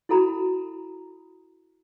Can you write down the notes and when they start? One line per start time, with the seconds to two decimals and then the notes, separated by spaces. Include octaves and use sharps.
0.09 E4 F#4 A4 A#5 B5